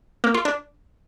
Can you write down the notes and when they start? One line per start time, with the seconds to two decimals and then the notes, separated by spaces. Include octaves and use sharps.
0.24 A#3
0.34 F4
0.45 D4